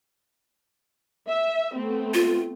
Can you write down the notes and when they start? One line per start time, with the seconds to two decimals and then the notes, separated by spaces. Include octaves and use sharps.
1.28 E5
1.74 A3 B3 C4
2.14 F4